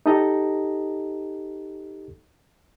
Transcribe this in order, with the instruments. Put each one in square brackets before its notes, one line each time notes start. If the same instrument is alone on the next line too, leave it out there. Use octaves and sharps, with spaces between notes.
[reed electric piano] D#4 G4 A4 D#5 A#5